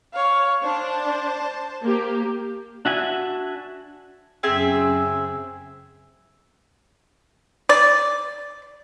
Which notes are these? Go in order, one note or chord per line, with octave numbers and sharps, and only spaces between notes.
C#5 F5
D4 C5 A5
A#3 G4
D4 F#4 E5 G#5
F#2 C#3 C4 G#4 E5
D5